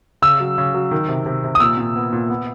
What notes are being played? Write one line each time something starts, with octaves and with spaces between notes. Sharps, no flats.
C#3 E6
F#3
C#3
F#3
D#3
C3
C3
C3
D#6
A#2 E6
A#2
B3
A#2
B3